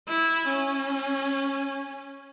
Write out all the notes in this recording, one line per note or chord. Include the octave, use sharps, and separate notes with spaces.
E4
C#4